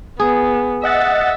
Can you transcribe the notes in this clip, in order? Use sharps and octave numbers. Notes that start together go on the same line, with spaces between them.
B3 G#4
D#5 E5 F#5 A6